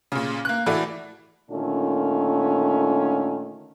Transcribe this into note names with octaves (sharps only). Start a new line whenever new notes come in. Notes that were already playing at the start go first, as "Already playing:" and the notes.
A#2 C#3
A#3 F#6
A2 E3 F#4 A4 D5
A#2 D3 D#3 A3 C#4 F4